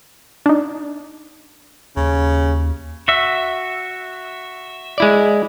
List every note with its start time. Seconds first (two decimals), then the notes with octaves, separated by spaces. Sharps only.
0.46 D4 D#4
1.97 D#2 C#3
3.08 F#4 E5
4.98 G#3 E4 D5